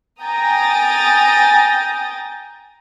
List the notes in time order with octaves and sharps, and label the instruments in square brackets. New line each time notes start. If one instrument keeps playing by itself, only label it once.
[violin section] G5 G#5 A#5 D#6 A6